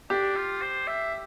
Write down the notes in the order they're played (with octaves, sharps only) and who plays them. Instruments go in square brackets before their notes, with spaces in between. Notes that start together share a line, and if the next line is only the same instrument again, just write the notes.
[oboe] D4 [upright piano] G4
[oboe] F4
C5
E5